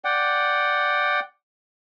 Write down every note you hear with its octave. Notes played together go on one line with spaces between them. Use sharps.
D5 F#5 G5